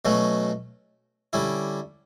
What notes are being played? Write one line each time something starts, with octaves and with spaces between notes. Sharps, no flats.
B2 F#3 A3 C#4
D3 G3 C#4 E4